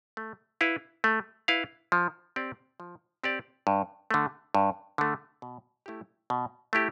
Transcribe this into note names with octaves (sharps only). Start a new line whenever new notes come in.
A3
E4 B4 F5
A3
E4 B4 F5
F3
C4 G4 D5
F3
C4 G4 D5
G2
D3 A3
G2
D3 A3
B2
A3 E4 G4
B2
A3 E4 G4